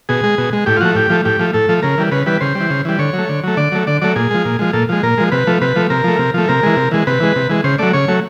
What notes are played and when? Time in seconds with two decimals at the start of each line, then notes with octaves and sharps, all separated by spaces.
0.09 B2 G#4
0.23 G#3
0.38 B2
0.53 G#3
0.66 A2 G4
0.77 F4
0.81 F3 A3 F#4
0.95 A2 G4
1.10 F3 A3
1.25 A2 G4
1.39 F3 A3
1.54 A2 A4
1.69 F3 A3
1.83 C#3 A#4
1.98 E3 G3
2.12 C#3 B4
2.26 E3 G3 B4
2.41 C#3 C5
2.55 G3
2.60 E3
2.70 C#3
2.85 E3 G3
2.99 D3 C#5
3.13 F#3
3.18 A3
3.29 D3
3.44 F#3 A3
3.57 D3 D5
3.72 F#3 A3
3.87 D3 D5
4.02 F#3 A3 D5
4.16 A#2 G#4
4.31 F3 G#3
4.45 A#2
4.59 F3 G#3
4.73 A#2 A4
4.89 F3 G#3
5.03 A#2 A#4
5.18 F3 G#3
5.32 C3 B4
5.47 F3 A3
5.61 C3 B4
5.76 F3 A3
5.90 C3 A#4
6.04 F3 A3
6.19 C3
6.34 F3 A3
6.48 C3 A#4
6.63 E3 G#3
6.77 C3
6.91 E3 G#3
7.07 C3 B4
7.20 E3 G#3
7.36 C3
7.49 E3 G#3
7.64 C#3 C5
7.79 F#3 A3 D5
7.93 C#3 C#5
8.08 F#3 A3